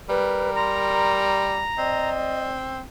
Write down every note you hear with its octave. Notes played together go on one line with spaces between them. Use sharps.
G3 A#4 B4
A#5 C6
C4 D5 D#5